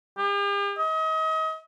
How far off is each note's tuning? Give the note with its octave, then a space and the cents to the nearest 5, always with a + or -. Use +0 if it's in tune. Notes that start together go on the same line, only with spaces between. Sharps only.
G4 +45
D#5 +35